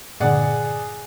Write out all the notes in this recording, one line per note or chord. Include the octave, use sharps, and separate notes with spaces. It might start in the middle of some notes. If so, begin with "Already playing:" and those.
G2 A#2 D3 G#4 D5 F#5